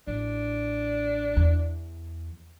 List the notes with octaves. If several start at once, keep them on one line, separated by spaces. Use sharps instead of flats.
A1 D4
E2